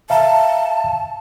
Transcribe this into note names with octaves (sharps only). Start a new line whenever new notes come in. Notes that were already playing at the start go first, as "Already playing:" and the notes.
E5 F5 A5 A#5